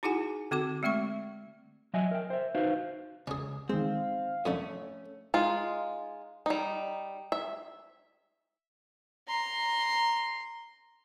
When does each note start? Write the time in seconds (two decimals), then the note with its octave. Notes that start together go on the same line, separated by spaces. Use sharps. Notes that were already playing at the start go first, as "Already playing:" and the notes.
0.03 D#4 E4 F#4 G#4 F#5 G#5
0.51 D3 C4 F#4 A4 D6
0.83 G#3 A3 C4 E5 C#6
1.94 F#3 D#5 E5 G#5
2.11 A#4 G5
2.30 C5 E5
2.55 D#4 F#4 B4 C5 F5
3.27 C#2 C#4 G#4
3.69 D#3 G#3 C4 F5
4.45 F2 D3 A3 C#4
5.34 G#3 D#4 F4
6.46 G3 D#4
7.32 E5
9.28 A#5 C6